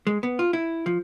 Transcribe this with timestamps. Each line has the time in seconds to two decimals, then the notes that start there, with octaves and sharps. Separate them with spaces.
0.07 G#3
0.23 B3
0.39 F4
0.53 E4
0.86 F3